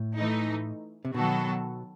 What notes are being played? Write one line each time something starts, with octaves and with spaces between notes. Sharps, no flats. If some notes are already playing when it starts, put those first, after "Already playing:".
Already playing: A2
E3 A3 D#4
C3
B2 D#3 F#3 B3 F#4 A4